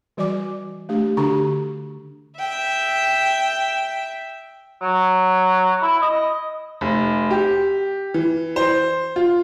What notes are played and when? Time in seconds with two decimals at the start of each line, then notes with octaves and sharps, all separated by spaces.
0.17 E3 G3 F#4 D5 G#5 D6
0.89 A3 D4 G4
1.17 D3 D4 F#4 G4 A#5 C#6
2.38 E5 G5
4.82 F#3
5.82 E4
6.02 D#5
6.81 F1
7.30 G4
8.14 E3
8.56 C5
9.16 F4